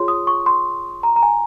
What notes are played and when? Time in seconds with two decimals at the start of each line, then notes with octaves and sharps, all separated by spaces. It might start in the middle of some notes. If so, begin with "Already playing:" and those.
Already playing: F4 G#4 C#5 C6
0.08 D#6
0.27 C#6
0.46 C6
1.03 A#5
1.16 A#5
1.23 G#5